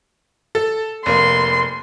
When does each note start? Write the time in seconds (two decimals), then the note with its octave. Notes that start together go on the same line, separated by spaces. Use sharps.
0.55 A4
1.06 F1 A#3 C6